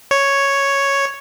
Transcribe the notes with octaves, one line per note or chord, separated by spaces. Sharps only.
C#5